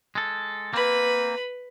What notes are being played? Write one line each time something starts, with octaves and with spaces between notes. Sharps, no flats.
G#3 A4
A#3 C4 B4 B5